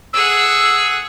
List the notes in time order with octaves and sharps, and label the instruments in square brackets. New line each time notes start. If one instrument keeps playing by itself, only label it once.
[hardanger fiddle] G#4 F#5 [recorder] E6